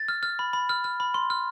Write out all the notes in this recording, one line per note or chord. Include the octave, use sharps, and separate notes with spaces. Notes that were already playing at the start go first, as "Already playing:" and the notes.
Already playing: A6
F6
F6
B5
B5
F6
F6
B5
C6
F6